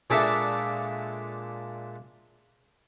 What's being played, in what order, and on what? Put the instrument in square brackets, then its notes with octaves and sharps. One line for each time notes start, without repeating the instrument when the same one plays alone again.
[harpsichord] A#2 G#3 D4 A4 E5 C#6